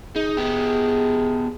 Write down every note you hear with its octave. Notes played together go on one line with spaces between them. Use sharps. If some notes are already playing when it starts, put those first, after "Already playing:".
D#4 G#4
B3 G4